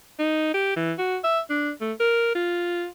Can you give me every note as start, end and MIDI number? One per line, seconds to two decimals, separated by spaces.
0.19 0.52 63
0.54 0.73 67
0.76 0.93 52
0.98 1.17 66
1.24 1.40 76
1.50 1.71 62
1.81 1.93 57
2.00 2.35 70
2.35 2.86 65